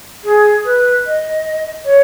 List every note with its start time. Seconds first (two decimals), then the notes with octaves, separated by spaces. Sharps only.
0.24 G#4
0.65 B4
1.06 D#5
1.85 C#5